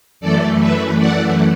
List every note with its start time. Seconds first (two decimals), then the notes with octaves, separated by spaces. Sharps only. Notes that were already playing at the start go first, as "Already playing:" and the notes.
0.20 F#2 E3 A3 A4 D5
0.60 B4 E5
0.98 D5 F#5